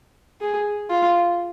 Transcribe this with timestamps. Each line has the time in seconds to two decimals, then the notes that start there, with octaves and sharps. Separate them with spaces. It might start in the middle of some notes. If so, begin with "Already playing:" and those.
0.41 G#4
0.90 F4